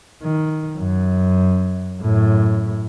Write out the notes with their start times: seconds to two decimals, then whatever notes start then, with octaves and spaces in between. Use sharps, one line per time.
0.23 D#3
0.78 F#2
2.01 F#2 A2